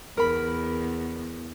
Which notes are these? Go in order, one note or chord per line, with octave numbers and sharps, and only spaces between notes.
E2 A#4 B5